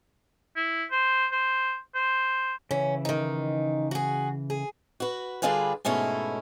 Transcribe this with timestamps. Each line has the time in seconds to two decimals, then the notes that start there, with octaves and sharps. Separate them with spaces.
0.57 E4
0.91 C5
1.32 C5
1.95 C5
2.71 C#3 E3 C#4 E5
3.05 D#3 D#4
3.91 F#4 G#4
4.50 G#4
5.00 F#4 B4
5.42 D3 G3 D4 F4 G#4 B4
5.85 G#2 B2 A3 C#4 E4